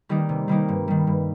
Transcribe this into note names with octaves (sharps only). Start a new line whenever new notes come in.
D#3 G3 A#3 D#4
C3
D#3 G3 A#3 D#4
G2
D#3 G3
G2